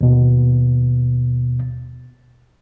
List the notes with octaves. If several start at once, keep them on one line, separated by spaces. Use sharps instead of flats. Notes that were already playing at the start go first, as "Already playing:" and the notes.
D#2 B2